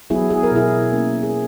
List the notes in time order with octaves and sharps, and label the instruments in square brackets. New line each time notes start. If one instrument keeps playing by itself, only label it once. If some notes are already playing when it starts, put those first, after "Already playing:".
[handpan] F#3 B3 E4 G#4
G#4
A#4
B2 E4 G#4
A#3 C#4
G#4